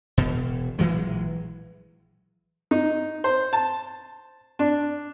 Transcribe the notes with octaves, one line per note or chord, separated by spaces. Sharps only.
E1 B2
A#1 E3 F#3 G#3
D#4
C5
A5
D4